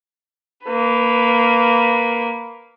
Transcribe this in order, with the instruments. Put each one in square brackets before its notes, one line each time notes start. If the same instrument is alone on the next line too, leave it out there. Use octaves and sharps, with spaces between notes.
[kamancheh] A#3 B4